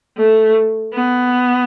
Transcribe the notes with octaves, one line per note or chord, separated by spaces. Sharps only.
A3
B3